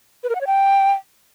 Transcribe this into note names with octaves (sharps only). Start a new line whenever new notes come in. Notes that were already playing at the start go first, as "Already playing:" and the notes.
B4
A#4
F#5
C#5
G5